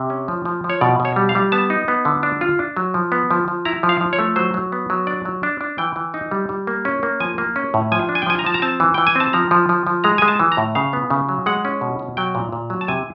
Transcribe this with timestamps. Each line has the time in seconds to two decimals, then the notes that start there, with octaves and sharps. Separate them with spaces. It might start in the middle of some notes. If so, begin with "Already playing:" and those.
Already playing: C3
0.10 C#4
0.28 F3
0.45 F3
0.64 F3
0.70 C#5
0.81 B2 D5
1.00 B2
1.05 C#5
1.16 G3
1.29 F5
1.35 G3
1.52 B3 A5
1.70 D#4
1.88 B3
2.05 D3
2.23 D4
2.41 F4
2.59 D4
2.77 F#3
2.94 F3
3.12 B3
3.31 F3
3.48 F3
3.65 E4 A#5
3.83 F3
3.89 F5
4.01 F3
4.13 C#5
4.19 A3
4.36 F#3 C5
4.54 F#3
4.72 B3
4.90 F#3
5.07 D4 D5
5.25 F#3
5.43 D4
5.61 D4
5.78 E3 G5
5.96 E3
6.14 D#4
6.31 G3
6.49 G3
6.67 A#3
6.85 C#4
7.03 A#3
7.20 F3 G#5
7.38 A#3
7.56 C#4
7.74 A2
7.92 F3 G#5
8.09 D4
8.15 G#5
8.22 G5
8.26 F3 G#5
8.39 A#5
8.44 F3 A5
8.54 A#5
8.62 C4 A5
8.80 E3
8.94 E3 G5
9.07 G#5
9.15 C4 A5
9.33 F3 A#5
9.51 F3
9.69 F3
9.87 F3
10.04 G#3 A#5
10.18 G#3 G#5
10.28 A5
10.40 E3
10.52 A#5
10.57 A2
10.75 C#3 F5
10.93 B3
11.10 C#3
11.29 F#3
11.46 G#3 F#5
11.65 C#4
11.81 B2
11.99 B2
12.17 F#3 G5
12.35 A#2
12.52 A#2
12.70 F#3
12.81 A5
12.88 C3 G#5